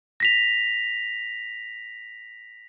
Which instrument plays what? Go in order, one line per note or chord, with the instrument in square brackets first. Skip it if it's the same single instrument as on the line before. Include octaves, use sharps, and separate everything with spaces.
[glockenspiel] A#6 B6 F7